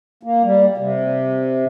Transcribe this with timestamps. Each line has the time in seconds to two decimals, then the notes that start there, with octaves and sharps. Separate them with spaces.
0.23 A#3
0.43 G3
0.77 C3